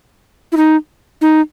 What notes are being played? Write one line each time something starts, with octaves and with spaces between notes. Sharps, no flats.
E4
D#4
D#4